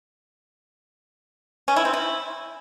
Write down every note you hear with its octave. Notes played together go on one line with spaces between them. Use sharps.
C#4
E4
C4
E4